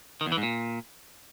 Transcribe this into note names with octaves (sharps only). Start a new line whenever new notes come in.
D#3
E2
E3
G#2
A#2